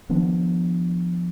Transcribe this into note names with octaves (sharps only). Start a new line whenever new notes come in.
D#3 F3 B3 D4